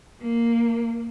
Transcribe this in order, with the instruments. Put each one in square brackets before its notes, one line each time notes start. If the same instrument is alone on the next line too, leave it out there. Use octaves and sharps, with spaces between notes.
[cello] A#3